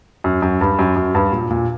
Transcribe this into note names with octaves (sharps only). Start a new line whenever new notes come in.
F#2
F#2
G2
F#2
F#2
G2
A#2
A#2